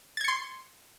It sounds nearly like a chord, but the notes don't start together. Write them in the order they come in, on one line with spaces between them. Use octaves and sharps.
A6 G#6 C#7 C6